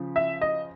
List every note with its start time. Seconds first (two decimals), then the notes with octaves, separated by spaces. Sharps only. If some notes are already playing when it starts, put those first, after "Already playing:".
Already playing: C#3 F3
0.16 E5
0.42 D#5